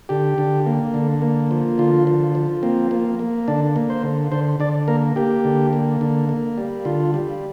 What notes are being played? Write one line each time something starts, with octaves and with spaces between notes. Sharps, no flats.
D3 G4
D3
A#3
D3
A#3
F3
D3 F4
F3
F3
A#3 C4
A#3
A#3
D3 D4
A#3
C5
D3
D3 C5
D3 D5
A#3 A#4
A#3 G4
D3
A#3
D3
A#3
G3
D3 F4
G3